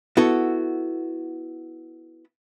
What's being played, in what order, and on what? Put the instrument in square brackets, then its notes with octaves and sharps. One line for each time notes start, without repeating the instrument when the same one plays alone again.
[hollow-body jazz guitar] B3 E4 F#4 A4